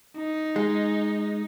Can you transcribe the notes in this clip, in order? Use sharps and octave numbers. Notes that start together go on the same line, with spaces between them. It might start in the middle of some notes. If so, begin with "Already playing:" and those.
D#4
G#3